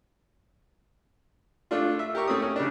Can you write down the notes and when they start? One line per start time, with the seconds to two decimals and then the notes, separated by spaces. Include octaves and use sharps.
1.71 A3 D4 F4
1.99 E5
2.15 G4 A#4 C#6
2.28 A3 C4 C#4 D#6
2.42 C#4
2.56 C#3 D4